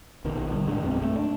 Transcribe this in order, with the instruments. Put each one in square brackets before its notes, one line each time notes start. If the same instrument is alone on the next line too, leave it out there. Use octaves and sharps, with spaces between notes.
[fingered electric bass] A#1 B2 D#3
D3 G3
F#1 A2 G#3 D4
A#1 F#2 B2 C4
A3
D4